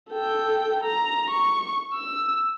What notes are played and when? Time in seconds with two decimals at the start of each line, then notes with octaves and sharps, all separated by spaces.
0.11 A4 G5
0.83 A#5
1.30 C#6
1.94 E6